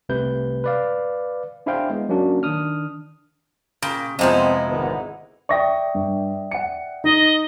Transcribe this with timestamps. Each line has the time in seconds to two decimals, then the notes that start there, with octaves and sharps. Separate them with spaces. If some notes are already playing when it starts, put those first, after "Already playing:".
0.09 C2 C3 A3 B4 G6
0.64 B4 D5 F5
1.66 D4 E4 G#4 C5 F5 G5
1.90 G#3 B3
2.09 F#3 A#3 C#4 D4 F#4
2.43 D#3 D4 D#6 F6
3.82 A#2 C#3 G5
4.19 F2 C3 F3 G#3 B3 C4 D#4 E4
4.67 G#1 D2 B3
5.49 D5 E5 G5 C#6 D#6 A#6
5.95 G2
6.51 F#5 C#7
7.04 D#4 D#5